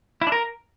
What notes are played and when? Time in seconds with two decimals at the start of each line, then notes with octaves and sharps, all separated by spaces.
0.21 E4
0.27 D4
0.32 A#4